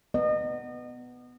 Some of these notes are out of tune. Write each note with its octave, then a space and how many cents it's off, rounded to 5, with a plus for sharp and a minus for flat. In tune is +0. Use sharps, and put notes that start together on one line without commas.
B3 +5 D#5 -30